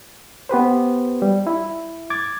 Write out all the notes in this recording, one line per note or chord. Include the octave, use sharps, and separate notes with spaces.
B3 G4 B4 C5
G3
E4
D6 G#6 A6